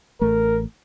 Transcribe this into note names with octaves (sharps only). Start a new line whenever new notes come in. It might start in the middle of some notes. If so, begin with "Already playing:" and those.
A1 A3 A#4